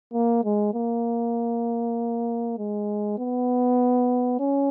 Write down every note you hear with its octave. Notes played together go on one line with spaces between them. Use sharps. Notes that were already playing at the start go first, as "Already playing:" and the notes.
A#3
G#3
A#3
G#3
B3
C#4